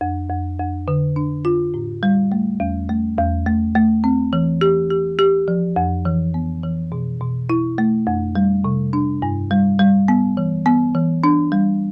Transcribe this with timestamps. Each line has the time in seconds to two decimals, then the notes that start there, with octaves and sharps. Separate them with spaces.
0.01 F2
0.30 F2
0.59 F2
0.88 D3
1.16 D4
1.45 F4
1.74 A2
2.03 G3
2.32 A3
2.60 E2
2.89 A3
3.18 E2
3.47 A3
3.75 A3
4.04 C4
4.33 E3
4.61 G4
4.90 G4
5.19 G4
5.48 F3
5.76 F2
6.05 E3
6.34 B3
6.63 E3
6.92 B2
7.21 B2
7.50 E4
7.78 A3
8.07 F2
8.35 G3
8.64 C3
8.93 D4
9.22 G2
9.51 G3
9.79 G3
10.08 B3
10.37 E3
10.66 B3
10.95 E3
11.24 D4
11.52 G3